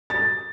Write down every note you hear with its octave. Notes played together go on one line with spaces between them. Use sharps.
A6